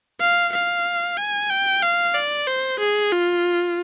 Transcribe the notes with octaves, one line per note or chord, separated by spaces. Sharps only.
F5
F5
G#5
G5
F5
D5
C5
G#4
F4